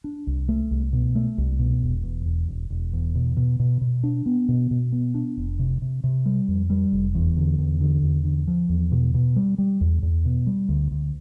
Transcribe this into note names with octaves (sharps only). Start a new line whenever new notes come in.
D4
C2
A3
C2
B2
A3
C2
B2
E1
E2
E1
E1
E1
E2
B2
B2
B2
B2
D4
B3
B2
B2
B3
D4
F1
C3
C3
C3
G3
F2
G3
F1
E2
D3
E2
D3
E2
D3
F3
E2
B2
B2
G3
G3
E2
E2
B2
G3
D2
D2